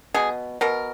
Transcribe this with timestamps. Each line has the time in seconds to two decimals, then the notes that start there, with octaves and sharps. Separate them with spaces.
0.14 B2 G#4
0.61 B2 A#4